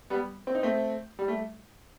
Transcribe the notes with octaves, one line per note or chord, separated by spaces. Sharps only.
G3 B3
C4
D#4
A3 C4
G3
A3